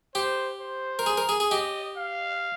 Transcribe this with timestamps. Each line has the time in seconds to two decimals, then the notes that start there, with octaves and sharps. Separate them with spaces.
0.15 G4 C5
0.60 C5
0.99 A#4
1.06 G#4
1.17 A#4
1.29 G#4
1.40 G#4
1.51 G4 D#5
1.97 F5